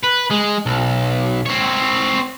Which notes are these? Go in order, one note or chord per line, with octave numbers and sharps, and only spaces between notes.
B4
G#3
B1
C4 C#5